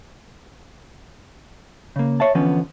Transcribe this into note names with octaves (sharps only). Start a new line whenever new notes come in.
C#3 A#3
C#5 E5 A5
D3 E3 F3 B3 C#4